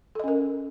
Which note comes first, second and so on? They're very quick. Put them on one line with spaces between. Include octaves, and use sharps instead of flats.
A4 D#5 C#4 A#4